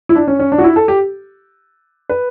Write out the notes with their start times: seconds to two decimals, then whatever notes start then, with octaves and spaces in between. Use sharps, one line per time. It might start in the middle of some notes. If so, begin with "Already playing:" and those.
0.09 E4
0.16 D4
0.27 C#4
0.39 C#4
0.52 D4
0.58 F#4
0.64 E4
0.76 A4
0.88 G4
2.09 B4